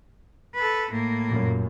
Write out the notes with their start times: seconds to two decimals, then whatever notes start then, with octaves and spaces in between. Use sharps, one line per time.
0.55 A4 B4
0.91 A2 A#3
1.28 F#2 A#2